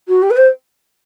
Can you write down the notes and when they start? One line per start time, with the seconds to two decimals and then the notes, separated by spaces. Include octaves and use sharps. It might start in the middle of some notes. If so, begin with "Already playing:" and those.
0.08 F#4
0.22 G4
0.30 B4
0.37 C5